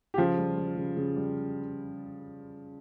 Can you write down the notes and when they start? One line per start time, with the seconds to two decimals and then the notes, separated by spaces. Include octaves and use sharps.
0.14 G4
0.18 C#3 F3 F4
0.38 G3
0.58 G3
0.77 C#3
0.97 C#3
1.16 G3